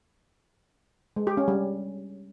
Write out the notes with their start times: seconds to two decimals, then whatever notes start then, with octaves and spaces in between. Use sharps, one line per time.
1.16 G#3
1.27 G4
1.37 C#4
1.48 G3